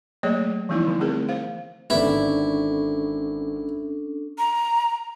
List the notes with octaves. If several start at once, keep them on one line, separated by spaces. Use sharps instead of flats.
F#3 A3 A#3 G#4 C#5 D#5
E3 F3 G3 B3 D#4 E4
D3
A3 C4 G#4 A#4
C5 F5
G#1 D3 B3 C#4 D4 E4 A4
A#5